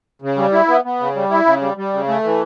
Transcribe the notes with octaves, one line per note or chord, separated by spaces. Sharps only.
C#3
G3
E4
B3
B3
C#3
G3
E4
C#3
G3
G3
C#3
A3
E3